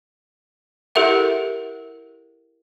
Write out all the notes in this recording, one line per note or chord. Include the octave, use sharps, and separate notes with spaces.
E4 G4 A4 A#4 E5 F#5